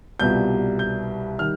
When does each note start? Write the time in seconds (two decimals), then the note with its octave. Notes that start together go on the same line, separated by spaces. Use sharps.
0.20 C2 B2 G3 B3 F4 G6
0.79 G6
1.39 D#3 G3 F6